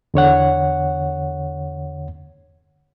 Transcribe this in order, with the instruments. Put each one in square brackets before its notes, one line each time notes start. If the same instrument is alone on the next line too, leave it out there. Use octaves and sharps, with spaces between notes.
[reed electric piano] E2 D3 C#5 F#5